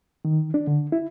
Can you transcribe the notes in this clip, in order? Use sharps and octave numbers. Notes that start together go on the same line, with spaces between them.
D#3
D4
D3
E4